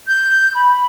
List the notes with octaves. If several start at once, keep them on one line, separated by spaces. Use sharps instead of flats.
G6
B5